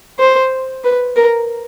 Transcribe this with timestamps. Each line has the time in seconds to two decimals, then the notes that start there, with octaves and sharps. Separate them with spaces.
0.19 C5
0.84 B4
1.16 A#4